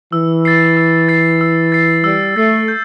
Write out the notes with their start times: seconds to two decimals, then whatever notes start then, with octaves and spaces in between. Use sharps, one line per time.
0.12 E3 E6
0.45 A6 C7
0.77 E6
1.09 A6 C7
1.41 E6
1.72 A6 C7
2.04 G3 E6
2.36 A3 A6 C7
2.68 G6